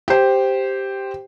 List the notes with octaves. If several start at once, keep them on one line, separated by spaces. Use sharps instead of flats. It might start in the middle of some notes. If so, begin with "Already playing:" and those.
G4 C5